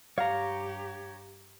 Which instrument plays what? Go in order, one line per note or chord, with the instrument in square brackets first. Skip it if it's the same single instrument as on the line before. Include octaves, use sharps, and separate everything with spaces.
[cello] G2 G4 [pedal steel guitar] C#5 A#5 [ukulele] F5